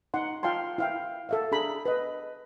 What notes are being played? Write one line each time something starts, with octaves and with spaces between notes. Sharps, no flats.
D#4 F#5 C6
F4 F5 G5 A5 C6
E4 F5 G5
A4 E5 F5
D4 G#4 A#5 B5
B4 D#5